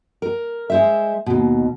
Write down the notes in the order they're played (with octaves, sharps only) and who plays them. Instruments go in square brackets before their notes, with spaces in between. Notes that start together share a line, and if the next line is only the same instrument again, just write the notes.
[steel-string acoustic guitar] A#4
G#3 C5 E5
D#2 B2